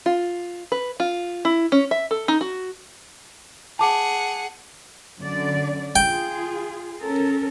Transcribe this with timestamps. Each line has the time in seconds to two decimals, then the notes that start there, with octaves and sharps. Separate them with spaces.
0.06 F4
0.72 B4
1.00 F4
1.45 E4
1.72 C#4
1.91 E5
2.11 A4
2.28 D#4
2.41 F#4
3.79 G#4 F#5 A5 D6
5.20 F#2 D3 D5
5.96 F4 G#4 G5
7.02 C#4 A4 A#4